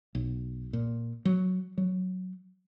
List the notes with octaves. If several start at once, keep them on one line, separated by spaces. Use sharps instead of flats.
B1
A#2
F#3
F#3